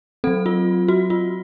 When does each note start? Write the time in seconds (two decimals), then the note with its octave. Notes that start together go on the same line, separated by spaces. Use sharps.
0.24 C4 A4
0.27 F#3
0.46 F4
0.88 F#4
1.10 F4